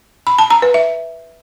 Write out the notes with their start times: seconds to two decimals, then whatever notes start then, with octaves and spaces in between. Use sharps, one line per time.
0.27 B5
0.39 A5
0.50 A#5
0.62 B4
0.74 E5